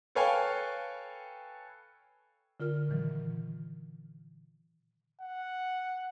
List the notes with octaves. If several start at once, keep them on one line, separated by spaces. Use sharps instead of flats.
A4 B4 C#5 F5 G5 G#5
D3 F4 A#4 F6
A#2 D#3 E3 F#3
F#5